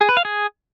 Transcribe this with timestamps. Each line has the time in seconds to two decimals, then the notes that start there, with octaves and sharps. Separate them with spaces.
0.01 G#4
0.09 B4
0.17 F5
0.25 G#4